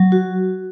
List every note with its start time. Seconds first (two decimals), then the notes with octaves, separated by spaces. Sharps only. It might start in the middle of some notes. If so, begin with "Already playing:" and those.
Already playing: F#3
0.12 F#4